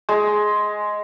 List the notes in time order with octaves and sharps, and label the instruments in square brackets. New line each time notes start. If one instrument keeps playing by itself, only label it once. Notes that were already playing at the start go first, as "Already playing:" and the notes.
[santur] G#3